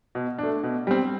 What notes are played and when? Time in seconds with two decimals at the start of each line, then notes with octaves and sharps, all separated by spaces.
0.15 B2
0.39 A3 D4
0.63 B2
0.87 G3 C4